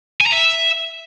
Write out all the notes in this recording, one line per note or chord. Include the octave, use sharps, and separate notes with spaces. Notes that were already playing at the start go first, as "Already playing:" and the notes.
G#5
A#5
E5